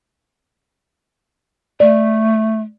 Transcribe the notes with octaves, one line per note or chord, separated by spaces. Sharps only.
A3 D5